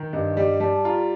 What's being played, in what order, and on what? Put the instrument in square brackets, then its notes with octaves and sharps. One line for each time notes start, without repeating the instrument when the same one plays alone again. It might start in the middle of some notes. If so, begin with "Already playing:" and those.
Already playing: [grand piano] D#3
[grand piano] G2 [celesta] D#5
[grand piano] G3 [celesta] D#5
[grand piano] G3 [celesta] A5
[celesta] A5
[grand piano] F4 [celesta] A#5